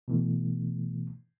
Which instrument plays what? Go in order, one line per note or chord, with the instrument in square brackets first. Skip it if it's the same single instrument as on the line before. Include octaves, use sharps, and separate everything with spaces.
[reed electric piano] B2 E3 A3